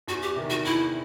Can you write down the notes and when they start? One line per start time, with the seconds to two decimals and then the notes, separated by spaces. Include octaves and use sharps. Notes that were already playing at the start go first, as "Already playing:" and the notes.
0.07 E2 F#4
0.22 G4
0.36 C3 D#3
0.50 F#4
0.64 E2 E4